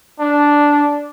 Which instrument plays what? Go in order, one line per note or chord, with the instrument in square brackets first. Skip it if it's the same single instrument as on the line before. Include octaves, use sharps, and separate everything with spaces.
[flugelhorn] D4